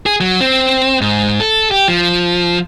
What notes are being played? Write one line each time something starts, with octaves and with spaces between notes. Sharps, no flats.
G#4
F#3
C4
G#2
A4
G4
F3